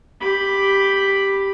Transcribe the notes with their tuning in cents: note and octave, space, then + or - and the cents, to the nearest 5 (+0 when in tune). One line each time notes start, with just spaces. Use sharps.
G4 +0 B5 +0